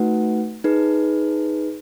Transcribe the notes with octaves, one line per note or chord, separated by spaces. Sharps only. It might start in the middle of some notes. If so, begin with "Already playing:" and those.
Already playing: A3 D#4 F#4 B4 F#5
D#4 G#4 B4